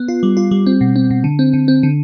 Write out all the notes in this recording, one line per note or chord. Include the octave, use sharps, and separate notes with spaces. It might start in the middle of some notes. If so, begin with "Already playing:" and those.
Already playing: B3
F4
G3
F4
G3
C4
B2
C4
B2
D3
C4
D3
C4
D3